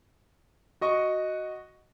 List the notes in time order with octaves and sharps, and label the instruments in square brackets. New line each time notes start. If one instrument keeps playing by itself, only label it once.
[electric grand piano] F#4 D#5 C#6